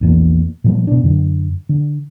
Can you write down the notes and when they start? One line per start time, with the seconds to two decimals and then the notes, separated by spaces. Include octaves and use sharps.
0.01 A#1 E2 A#2
0.64 A#2 F3 G3
0.87 B2 D4
1.04 F#2 D3
1.69 D3